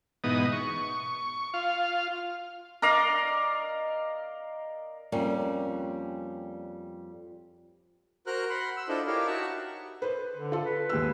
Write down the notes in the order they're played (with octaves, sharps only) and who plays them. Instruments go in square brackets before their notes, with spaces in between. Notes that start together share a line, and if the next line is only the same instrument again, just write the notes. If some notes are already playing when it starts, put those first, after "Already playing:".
[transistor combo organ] G#2 B2 E3 B3 D#4 D#6
C#6
F4 F5
[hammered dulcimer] A#4 D5 D#5 F5
[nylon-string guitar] F2 G3 A#3 C#4
[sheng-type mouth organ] F#4 A#4 C5 A#5 F6 F#6
F#5 B5 C6
E6
D4 E4 F4 A4 C5 D#5
E4 G4 A#4 C#5 D#5 F5
D#4 F#4 E5 F#5 A5
[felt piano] B4 C5
[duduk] D3
[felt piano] F4 A4
[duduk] B4
[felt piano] D#2 G#3 E6